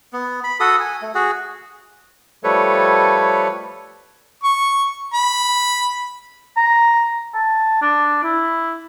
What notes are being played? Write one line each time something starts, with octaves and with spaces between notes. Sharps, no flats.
B3
B5
F#4 A4 D#6
G#5
A3
F#4 G#4
F3 G3 A3 A4 B4 C#5
C#6
B5
A#5
A5
D4
E4